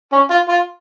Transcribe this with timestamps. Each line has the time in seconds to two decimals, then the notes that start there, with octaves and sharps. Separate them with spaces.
0.12 C#4
0.30 F4
0.49 F4